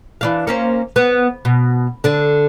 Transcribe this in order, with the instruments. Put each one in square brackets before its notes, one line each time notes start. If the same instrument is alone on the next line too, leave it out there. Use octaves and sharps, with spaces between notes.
[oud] E3 D4 F5
A#3 C#4 C5
B3
B2
D3 D4